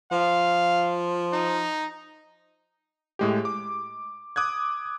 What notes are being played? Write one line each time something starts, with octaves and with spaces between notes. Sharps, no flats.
F3 F5
D#4
A2 G#3 G4
D6
D6 D#6 F#6 G#6